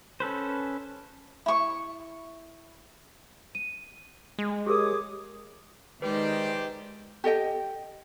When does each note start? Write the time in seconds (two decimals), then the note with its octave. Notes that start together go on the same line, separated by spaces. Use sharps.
0.20 C#4 A4 B4 C5
1.46 E4 C#6
3.55 D#7
4.38 G#3
4.66 G4 G#4 A#4 C#5 D6 D#6
6.02 D#3 G#3 G4 B4 C5 D5
7.24 G4 A4 D#5 G5